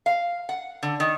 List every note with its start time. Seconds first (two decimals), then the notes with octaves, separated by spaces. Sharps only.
0.06 F5
0.49 F#5
0.83 D3
1.00 D#3